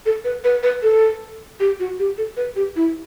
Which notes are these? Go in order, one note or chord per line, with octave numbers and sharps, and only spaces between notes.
A4
B4
B4
B4
A4
G4
F#4
G4
A4
B4
G4
E4